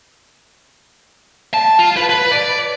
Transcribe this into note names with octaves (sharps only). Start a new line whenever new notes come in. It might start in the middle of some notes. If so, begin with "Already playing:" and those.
A5
F4
B4
B4
D5